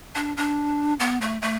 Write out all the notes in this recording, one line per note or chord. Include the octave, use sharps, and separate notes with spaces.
D4
D4
B3
A3
A3